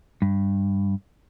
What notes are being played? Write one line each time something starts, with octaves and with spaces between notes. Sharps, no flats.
G2